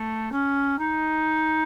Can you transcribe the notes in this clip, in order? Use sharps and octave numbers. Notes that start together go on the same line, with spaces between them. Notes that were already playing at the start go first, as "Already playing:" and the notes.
Already playing: A3
C#4
D#4